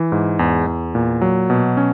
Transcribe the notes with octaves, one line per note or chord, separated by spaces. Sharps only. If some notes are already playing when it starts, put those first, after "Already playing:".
Already playing: E3
G#2
E2
E2
A#2
F#3
B2
C#4